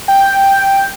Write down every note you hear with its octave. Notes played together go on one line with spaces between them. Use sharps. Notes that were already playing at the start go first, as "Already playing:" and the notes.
G5